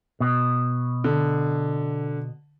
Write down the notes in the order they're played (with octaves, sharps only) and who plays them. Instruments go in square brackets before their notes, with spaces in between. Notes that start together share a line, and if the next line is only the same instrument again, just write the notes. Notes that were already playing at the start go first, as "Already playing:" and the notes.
[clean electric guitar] B2
[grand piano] D3